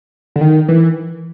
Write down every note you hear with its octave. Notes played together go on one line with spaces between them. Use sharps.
D3
D#3
E3